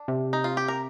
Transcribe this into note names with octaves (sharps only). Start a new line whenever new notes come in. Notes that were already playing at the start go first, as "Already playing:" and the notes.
Already playing: D4
C3
D#4
F4
G4
A#4